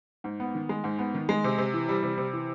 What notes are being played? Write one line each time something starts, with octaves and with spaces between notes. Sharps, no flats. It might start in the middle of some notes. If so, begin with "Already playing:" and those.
G#2
B3
D#3
G#3
G#2
B3
D#3
G#3
C3
C3
E3
G3
C3
C3
E3